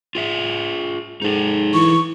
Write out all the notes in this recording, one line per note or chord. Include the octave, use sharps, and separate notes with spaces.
F4 G#4 E5
G#2 D#4 A4
E3 C#6